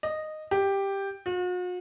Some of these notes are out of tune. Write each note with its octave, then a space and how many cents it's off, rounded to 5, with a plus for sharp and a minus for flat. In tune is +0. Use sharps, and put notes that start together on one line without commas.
D#5 -10
G4 +5
F#4 -45